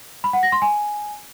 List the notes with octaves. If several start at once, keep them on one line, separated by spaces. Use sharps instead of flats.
B5
F#5
A#6
C6
G#5